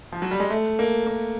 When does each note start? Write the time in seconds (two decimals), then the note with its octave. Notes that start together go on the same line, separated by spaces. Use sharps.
0.12 F3
0.22 F#3
0.31 G3
0.40 G#3
0.50 A3
0.79 A#3
1.06 A#3